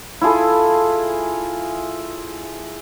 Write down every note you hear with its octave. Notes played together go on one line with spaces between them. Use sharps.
E4 F4 G#4 A4